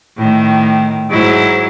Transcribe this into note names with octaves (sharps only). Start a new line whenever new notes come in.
A2 D#3
G#2 F#3 E4